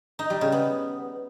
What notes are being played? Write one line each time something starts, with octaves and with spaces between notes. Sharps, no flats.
D#4
G3
C#3
B3